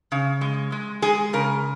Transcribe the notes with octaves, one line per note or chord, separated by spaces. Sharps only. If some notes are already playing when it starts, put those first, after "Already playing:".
C#3
G#3
G#3
G#3 G#4
C#3 A#4